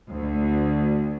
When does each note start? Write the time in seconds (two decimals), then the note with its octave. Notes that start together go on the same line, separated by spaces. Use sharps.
0.11 D2